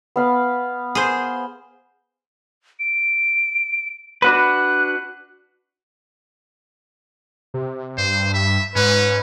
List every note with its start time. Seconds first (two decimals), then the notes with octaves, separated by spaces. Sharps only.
0.16 B3 F5 B5
0.95 G#4 C5
2.80 D7
4.22 D4 F#4 B4 F#6
7.54 C3
7.98 G2 C5
8.34 E5
8.76 G#2 C#4 B4